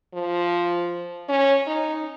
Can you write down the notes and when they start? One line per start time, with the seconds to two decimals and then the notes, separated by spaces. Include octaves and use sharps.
0.14 F3
1.29 C#4
1.66 D#4